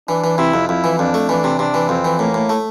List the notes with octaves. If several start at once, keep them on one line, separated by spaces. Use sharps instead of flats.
E3 D4
E3
C3 E4
F2
F2 E4
E3
F2 D4
A3
E3 D4
C3
C3 D4
E3
F2 C4
E3
A2 A#3
A2
A3